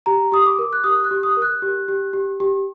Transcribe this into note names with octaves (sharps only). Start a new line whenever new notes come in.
G4 A#5
G4 D#6
D6
A#4
F#6
G4 D#6
F#6
G4
D#6
A#4
F#6
G4
G4
G4
G4